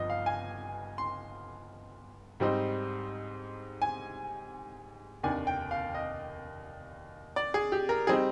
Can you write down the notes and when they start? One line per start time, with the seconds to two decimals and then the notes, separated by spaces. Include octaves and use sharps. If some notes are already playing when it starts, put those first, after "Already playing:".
Already playing: G1 G2 F3 D#5
0.10 F5
0.26 G#5
0.98 C6
2.40 G#2 G3 C4 D#4
3.82 G#5
5.23 F1 D#2 D#3 A#3 D4 G#5
5.47 G5
5.71 F5
5.94 D#5
7.36 D5
7.54 G#4
7.72 G4
7.89 A#4
8.07 G3 C4 D#4 G#4